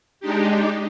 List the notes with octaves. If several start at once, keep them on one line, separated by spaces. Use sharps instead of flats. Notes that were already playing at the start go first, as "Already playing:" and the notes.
G#3 D4 D#4 G4